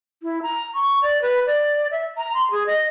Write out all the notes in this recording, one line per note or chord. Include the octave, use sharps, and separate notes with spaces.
E4
A#5
C#6
D5
B4
D5
E5
A#5
C6
G#4
D#5